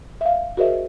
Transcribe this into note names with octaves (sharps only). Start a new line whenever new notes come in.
E5 F5
F#4 G#4 A#4 C5 D#5 E5